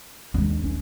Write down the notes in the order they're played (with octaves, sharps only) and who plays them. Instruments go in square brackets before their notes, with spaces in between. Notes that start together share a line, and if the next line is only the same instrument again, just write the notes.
[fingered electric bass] D#2 [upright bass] G#3 D4
[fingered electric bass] D#1 A#1 C#4